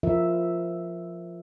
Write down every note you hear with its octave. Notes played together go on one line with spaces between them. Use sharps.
F3 F4 A#4 E5